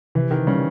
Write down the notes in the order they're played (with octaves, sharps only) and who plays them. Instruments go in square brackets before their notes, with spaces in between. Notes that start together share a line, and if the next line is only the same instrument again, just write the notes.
[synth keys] C3 [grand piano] E3
[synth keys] C3 [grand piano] D#3
[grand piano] C#3 [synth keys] G3